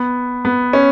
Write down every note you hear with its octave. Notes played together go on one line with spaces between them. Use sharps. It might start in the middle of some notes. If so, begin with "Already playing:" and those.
Already playing: B3
B3
C#4